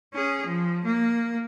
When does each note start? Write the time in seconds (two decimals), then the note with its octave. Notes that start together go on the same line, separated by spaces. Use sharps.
0.14 C#4 G#4
0.47 F3
0.85 A#3